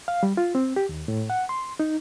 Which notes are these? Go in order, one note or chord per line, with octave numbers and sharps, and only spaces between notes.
F5
G3
F4
C4
G4
D#2
A2
F#5
C6
D#4